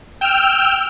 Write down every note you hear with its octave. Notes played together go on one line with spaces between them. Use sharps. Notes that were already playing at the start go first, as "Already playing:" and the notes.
G5 E6 F6